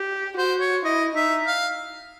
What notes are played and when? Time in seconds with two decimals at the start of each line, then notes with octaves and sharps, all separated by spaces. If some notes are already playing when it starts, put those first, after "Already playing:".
Already playing: G4
0.38 F#4 C5
0.61 C#5
0.84 E4 D#5
1.15 D#4 E5
1.47 F5